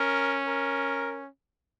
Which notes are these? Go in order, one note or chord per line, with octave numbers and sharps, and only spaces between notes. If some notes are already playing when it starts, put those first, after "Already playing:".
Already playing: C#4 A#4
A#4